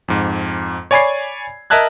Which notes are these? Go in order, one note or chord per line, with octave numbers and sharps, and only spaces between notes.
F2 G#2
C#5 D5 G#5 B5 G#6 C7
A#4 D#5 E5 A5 F#6 G#6